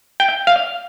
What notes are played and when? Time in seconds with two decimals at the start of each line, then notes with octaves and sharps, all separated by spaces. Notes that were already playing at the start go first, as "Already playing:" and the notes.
0.20 G5
0.47 F5